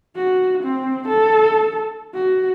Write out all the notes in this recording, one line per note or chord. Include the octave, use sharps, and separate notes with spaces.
F#4
C4
A4
F#4